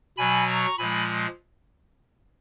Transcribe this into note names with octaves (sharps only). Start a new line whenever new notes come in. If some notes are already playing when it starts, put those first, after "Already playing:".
B2 F#3 G#5 B5
A#5 C#6
A#2 F3 G#3 G#5 B5